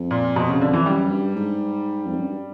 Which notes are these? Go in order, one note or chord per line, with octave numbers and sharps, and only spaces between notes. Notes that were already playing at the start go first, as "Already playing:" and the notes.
Already playing: F2
A#2
F2 B2
C#3
D3
E3
F#2 G3
G2
G#2
F2
F#2
G2